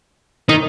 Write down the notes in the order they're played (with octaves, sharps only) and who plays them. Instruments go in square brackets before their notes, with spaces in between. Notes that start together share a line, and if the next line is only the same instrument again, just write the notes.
[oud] D#3 [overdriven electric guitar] D#4